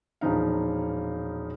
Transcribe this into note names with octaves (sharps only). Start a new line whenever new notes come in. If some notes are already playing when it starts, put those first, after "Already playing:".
E1 A#2 F3 D#4 F5